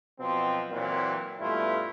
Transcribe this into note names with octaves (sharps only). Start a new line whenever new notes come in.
B2 F3 F#3 C4
A#2 E3 F#3 C4
G2 B2 A3 E4 F4